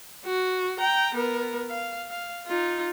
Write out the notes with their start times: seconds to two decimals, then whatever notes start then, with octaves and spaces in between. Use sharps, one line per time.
0.25 F#4
0.79 G5 A#5
1.14 B3 A#4
1.69 F5
2.09 F5
2.47 D#4 F4